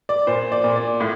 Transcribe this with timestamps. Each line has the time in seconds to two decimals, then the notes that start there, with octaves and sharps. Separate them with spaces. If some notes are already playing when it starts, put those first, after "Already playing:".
0.09 D5
0.27 A#2 C5
0.52 D5
0.64 A#2
0.76 D5
1.00 A2